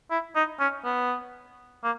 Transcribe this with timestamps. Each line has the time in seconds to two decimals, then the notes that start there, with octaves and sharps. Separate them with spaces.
0.11 E4
0.35 D#4
0.59 C#4
0.84 B3
1.83 A#3